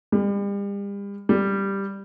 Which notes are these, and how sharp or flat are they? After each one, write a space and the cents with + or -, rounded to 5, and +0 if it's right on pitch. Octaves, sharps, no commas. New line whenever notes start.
G3 +40
G3 +5